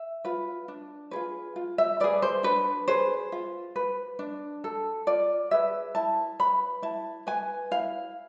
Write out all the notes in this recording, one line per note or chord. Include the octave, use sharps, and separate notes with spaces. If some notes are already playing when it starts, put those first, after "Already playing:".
Already playing: E5
F4 B4
D4
F4 G#4 B4
F4
E5
G#4 B4 D5
C5
D4 B4
G#4 B4 C5
F4
B4
D4
A4
F4 D5
G#4 B4 E5
E4 A5
B4 B5
E4 A5
B4 G#5
E4 F5